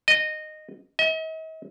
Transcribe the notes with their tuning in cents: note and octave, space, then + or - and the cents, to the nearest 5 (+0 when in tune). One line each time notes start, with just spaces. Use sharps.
D#5 -15
D#5 +45